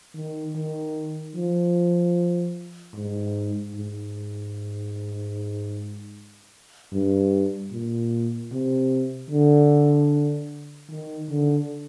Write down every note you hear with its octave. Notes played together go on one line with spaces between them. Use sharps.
D#3
D#3
F3
G#2
G#2
G2
A#2
C3
D3
D#3
D3